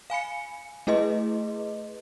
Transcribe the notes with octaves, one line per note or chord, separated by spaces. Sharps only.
F5 G#5 B5 C#7
A3 E4 G#4 B4 D#5 C6